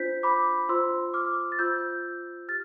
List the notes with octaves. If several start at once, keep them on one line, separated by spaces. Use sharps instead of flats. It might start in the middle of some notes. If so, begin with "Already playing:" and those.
Already playing: D4 F4 C5 G6 B6
B5 D6
F4 C5 C6 E6
D6 F6
A6
F4 C5 E6 G6
G4 F6 A6